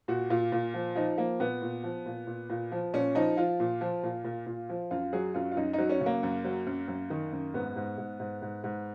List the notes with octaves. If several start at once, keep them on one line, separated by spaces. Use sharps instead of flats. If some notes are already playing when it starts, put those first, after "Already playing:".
A#2 F#4
A#2 F4
A#2
F3
F3 D#4
F3 A#3
A#2 B3
A#2
F3
A#2
A#2
A#2
F3
A#2 C#4
F3 D#4
F3 F4
A#2
F3
A#2
A#2
A#2
F3
F#2 F4
F#3 G#4
F#2 F4
F4
F#2 D#4
D#4
F#3
C#4
C#3
A#3
F#2
F#3
F#2
F#2
D#3
F#2
G#2 B3
G#2
G#2
G#2
G#2
G#2